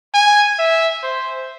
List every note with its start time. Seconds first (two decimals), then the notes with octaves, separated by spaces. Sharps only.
0.14 G#5
0.59 E5
1.03 C5